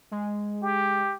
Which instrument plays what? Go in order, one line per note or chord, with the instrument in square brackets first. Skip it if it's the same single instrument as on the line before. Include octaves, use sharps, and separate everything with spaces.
[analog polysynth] G#3
[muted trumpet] G4